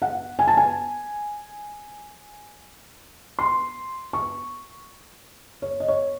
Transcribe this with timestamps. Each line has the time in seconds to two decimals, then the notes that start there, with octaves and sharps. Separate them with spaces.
0.02 F#5
0.39 G#5
0.48 A5
0.57 G#5
3.39 C6
4.13 C#6
5.62 C#5
5.80 D#5
5.88 C#5